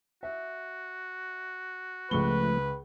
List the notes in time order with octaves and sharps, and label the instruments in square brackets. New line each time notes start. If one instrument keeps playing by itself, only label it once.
[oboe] F#4 [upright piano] E5
[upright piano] C#2 C#6 G7 [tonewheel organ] F3 A3 [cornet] B4